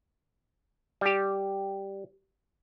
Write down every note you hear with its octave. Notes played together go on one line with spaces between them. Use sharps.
G3 G4